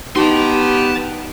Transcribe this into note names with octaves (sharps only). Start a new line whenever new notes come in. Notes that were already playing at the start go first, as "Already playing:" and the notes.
B3 D#4 G4 A5 C6